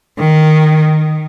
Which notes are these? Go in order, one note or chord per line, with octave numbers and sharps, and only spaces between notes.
D#3